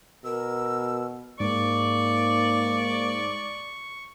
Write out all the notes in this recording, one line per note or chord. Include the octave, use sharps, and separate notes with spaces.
B2 A#4 E6
G#2 A#3 D5 C#6